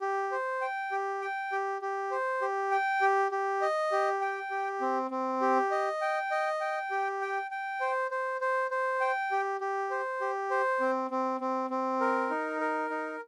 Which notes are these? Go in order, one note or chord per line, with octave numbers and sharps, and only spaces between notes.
G4
C5
G5
G4
G5
G4
G4
C5
G4
G5
G4
G4
D#5
G4
G5
G4
C4
C4
G4
D#5
G5
D#5
G5
G4
G5
G5
C5
C5
C5
C5
G5
G4
G4
C5
G4
C5
C4
C4
C4
C4
A#4
D#4
A#4
D#4